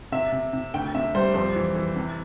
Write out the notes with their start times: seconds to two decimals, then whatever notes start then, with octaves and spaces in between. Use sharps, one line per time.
0.12 C3 E5
0.32 C3
0.53 C3
0.74 D2 G5
0.95 C3 E5
1.15 G3 C5
1.34 F2 C5
1.55 E3
1.75 E3
1.96 C3